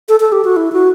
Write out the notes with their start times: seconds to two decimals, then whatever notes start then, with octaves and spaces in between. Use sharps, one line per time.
0.09 A4
0.20 A4
0.32 G4
0.45 F#4
0.56 E4
0.72 F#4